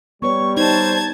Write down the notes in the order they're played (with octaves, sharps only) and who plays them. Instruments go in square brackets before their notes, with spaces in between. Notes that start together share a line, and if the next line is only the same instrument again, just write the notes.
[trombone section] G3 [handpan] B3 B4 C#5 [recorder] C#6
[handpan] D#4 [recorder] C5 [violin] A5 G#6